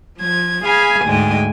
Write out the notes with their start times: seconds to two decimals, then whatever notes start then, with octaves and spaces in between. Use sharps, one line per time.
0.20 F3 G#6
0.65 G#4 F5 G#5 B5
1.06 D2 G#2 G#3 G5 G#5